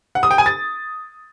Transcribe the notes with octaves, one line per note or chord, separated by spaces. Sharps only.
F#5
D#6
G5
G#5
A6